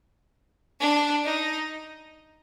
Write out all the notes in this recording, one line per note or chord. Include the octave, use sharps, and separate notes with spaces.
D4
D#4